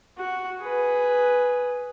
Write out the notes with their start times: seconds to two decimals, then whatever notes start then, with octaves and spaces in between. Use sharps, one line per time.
0.18 F#4
0.60 G#4 B4